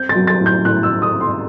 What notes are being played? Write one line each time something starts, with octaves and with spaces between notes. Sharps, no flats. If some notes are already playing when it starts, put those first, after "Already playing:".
Already playing: C4 G6
A6
F#3
A6
A2
G6
A2 F#6
E6
A2
D#6
C4
C6